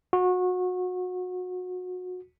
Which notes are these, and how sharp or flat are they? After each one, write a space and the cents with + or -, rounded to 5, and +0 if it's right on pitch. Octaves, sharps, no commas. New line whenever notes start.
F#4 -25